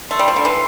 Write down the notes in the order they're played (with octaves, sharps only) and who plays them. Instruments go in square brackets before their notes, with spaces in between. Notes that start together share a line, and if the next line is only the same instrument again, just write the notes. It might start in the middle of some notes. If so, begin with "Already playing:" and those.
[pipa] A3 [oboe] C6
[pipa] G3
F3
D3
E3